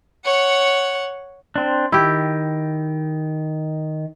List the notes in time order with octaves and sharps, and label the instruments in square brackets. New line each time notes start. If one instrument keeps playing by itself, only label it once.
[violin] C#5 F#5
[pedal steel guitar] C4 D4
[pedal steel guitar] D#3 [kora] E4 G4